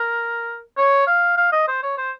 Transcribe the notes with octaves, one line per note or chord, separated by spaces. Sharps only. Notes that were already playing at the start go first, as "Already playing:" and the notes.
Already playing: A#4
C#5
F5
F5
D#5
C5
C#5
C5